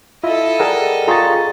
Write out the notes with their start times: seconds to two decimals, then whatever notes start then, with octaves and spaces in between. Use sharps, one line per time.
0.24 E4 F4 A4 D#5
0.59 G3 G#4 A#4 F#5
1.08 F4 G#4 A#5 C#6 A6